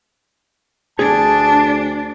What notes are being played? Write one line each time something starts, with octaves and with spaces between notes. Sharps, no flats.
D2 D4 G#4 A5